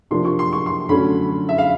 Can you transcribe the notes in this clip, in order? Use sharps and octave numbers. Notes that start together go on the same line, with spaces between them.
C3 F3 A#3 D4 C6
C#6
C6
C#6
C6
D3 F#3 A3 C#4 B5
E5
F5